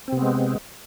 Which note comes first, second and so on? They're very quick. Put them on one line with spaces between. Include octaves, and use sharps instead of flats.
C4 C3 B3 G#3